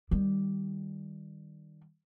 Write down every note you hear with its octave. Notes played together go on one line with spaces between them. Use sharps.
D#3 G3